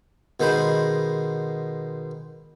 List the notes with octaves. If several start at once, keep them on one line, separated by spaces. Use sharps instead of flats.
B2 D#3 G#3 C5 B5